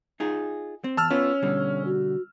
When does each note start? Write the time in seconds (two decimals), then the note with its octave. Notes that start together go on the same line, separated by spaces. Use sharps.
0.20 D#4 F4 G#4
0.84 C4
0.97 E2 A5 E6 F6
1.10 B3 C#4 F4 C#5
1.42 B2 D3 G3
1.85 F#4